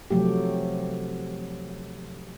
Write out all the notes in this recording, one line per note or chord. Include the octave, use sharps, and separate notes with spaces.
C3 F3 F#3 A3 G4